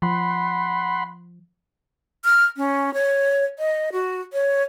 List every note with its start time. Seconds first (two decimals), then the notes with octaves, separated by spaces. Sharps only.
0.02 F3 F#5 B5 C6
2.25 F6
2.57 C#4
2.94 C#5
3.59 D#5
3.92 F#4
4.33 C#5